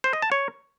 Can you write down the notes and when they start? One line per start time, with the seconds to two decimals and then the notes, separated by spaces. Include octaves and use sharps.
0.04 C5
0.13 D#5
0.22 A5
0.32 C#5